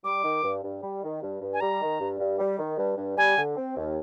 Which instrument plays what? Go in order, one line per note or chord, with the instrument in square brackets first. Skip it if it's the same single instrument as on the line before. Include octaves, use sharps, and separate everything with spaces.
[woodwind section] G3 [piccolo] D6
[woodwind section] D#3
G2
G2
G3
D#3
G2
G2
[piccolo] G#5
[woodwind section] G3 [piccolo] A#5
[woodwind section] D#3
G2
G2
G3
D#3
G2
G2
[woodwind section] G3 [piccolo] G#5
[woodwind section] D3
C4
D#2